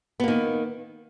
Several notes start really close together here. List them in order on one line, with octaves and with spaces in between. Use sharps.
B3 A#3 D#3